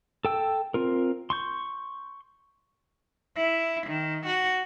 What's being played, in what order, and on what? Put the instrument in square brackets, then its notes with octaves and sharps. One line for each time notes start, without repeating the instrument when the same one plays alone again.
[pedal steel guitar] A4 G5 E6
C4 F4 A#4
C6 C#6 G6
[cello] E4
D#3
F#4